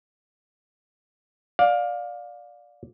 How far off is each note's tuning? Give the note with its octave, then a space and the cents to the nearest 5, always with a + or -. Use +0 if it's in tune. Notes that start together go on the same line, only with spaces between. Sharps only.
D5 +0 F5 +20